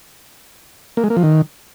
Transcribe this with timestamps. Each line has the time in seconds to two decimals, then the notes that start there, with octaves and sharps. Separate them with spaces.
0.97 A#3
1.04 G#3
1.10 A#3
1.17 F3
1.23 D#3